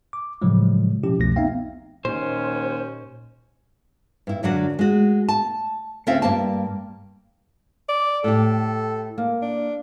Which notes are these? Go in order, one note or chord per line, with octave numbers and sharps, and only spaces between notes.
D6
A2 C#3 F3 F#3 G#3
B2 F3 C#4 E4 G4
C2 F2 B2 F3 A3 A#6
B3 C4 D#4 E5 F5 G5
D#2 A#2 C#4 C5
G2 E4
F#2 D3 F#3 D4 F#4
G#3 F#4
A5
D2 C4 C#4 F4 E5 F5
G2 G3 A#3 G5 A5
D5
A2 G4 A4
A#3
D4